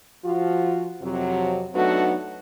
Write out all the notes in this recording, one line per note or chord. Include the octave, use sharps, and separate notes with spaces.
F3 F4 F#4
F2 C3 F#3
F#3 A3 B3 D4 D#4 F#4